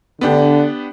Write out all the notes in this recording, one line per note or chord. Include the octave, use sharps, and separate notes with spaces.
D3 B3 D4 G4